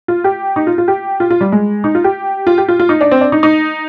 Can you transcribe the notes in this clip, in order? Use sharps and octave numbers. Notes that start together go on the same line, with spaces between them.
F4
G4
D#4
F4
F4
G4
F4
F4
G3
G#3
D#4
F4
G4
F4
G4
F4
F4
D#4
D4
C4
D4
D#4
D#4